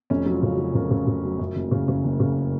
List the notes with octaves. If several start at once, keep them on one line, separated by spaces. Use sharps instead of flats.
F1 C#4
F#3 F4
C#3
F#3 F#4
C#3 A#4
C#3
C#3
F#3
F#2
F#1
C#3
C#3
F#1
C#3